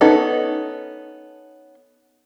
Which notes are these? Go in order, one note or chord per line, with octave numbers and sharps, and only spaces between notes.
B3 C#4 D#4 A4